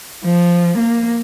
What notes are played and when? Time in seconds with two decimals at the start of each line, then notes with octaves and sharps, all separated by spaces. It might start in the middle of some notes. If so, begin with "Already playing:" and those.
0.25 F3
0.78 A#3